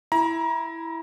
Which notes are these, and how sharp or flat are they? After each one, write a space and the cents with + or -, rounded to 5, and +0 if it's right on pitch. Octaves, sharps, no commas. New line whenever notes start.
E4 +0 A#5 +30